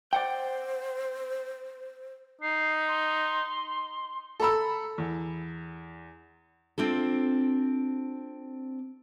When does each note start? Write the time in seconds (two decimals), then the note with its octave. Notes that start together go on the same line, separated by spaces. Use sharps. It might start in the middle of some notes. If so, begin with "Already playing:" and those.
0.13 C5 D5 F#5 G5
2.41 D#4 C7
2.88 C6
4.40 A4 A#5 B5 E6
4.98 E2
6.78 C4 D4 F4 A4